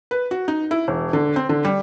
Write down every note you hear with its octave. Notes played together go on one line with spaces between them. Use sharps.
B4
F#4
D#4
E4
E1
D3
C4
D3
G3